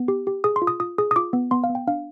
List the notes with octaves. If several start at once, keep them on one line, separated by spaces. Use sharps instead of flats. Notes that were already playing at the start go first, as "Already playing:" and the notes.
Already playing: B3
G4
G4
G#4 D#6
C6
F4
D#6
F4 D#6
G#4 D#6
D#6
F4 D6
B3
B3 C6
F5
B3
G5
D4 F5